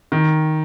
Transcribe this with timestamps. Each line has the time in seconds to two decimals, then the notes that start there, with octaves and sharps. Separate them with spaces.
0.12 D#3